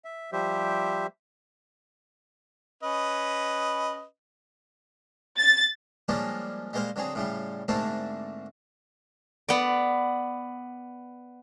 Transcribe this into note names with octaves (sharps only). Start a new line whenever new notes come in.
E5
F3 G3 G4 C5 E5
C#4 B4 D#5
A6
F3 G3 G#3 A#3 C#4 D4
G3 G#3 A#3 C5 F5
D3 F#3 C4 G#4
A2 C#3 G3
G#2 D3 A3 A#3 C4 D4
B3 D5